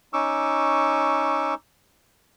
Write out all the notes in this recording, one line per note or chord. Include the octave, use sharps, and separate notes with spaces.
C#4 D#4 C#6 D6 E6